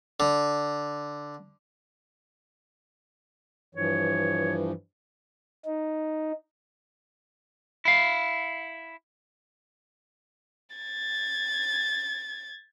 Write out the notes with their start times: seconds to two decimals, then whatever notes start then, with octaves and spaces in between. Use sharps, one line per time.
0.20 D3
3.75 G2 E3 F3 C#5
5.65 D#4
7.85 E4 F5
10.76 G#6 A6